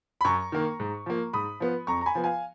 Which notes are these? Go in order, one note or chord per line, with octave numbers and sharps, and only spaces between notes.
B5
F#2 A#5 C#6
D#3 A#3
G#2
F3 A#3
G#2 B5 D#6
F3 B3
F2 A#5 C#6
A#5
G#5 B5
F3 B3
F5 G#5